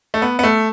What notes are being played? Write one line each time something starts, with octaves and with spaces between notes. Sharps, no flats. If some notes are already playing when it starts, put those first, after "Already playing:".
A3
B3
B3
A3